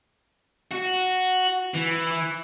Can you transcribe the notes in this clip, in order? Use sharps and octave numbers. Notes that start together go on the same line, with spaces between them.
F#4
E3